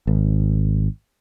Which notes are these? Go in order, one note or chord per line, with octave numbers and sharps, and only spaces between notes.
G#1